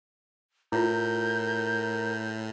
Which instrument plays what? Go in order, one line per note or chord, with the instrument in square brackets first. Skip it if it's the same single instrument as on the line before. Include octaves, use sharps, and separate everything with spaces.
[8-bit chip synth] A2 [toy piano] E4 F4 [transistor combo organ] A#4 [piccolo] G6